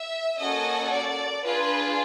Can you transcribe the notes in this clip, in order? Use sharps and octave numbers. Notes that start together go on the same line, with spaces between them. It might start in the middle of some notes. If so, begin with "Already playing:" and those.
Already playing: E5
A#3 C#4 F#4 A4 D#5
D5
D4 F4 G#4 B4